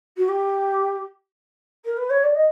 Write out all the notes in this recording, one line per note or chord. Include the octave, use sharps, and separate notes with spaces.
F#4
G4
A#4
B4
C#5
D5
D#5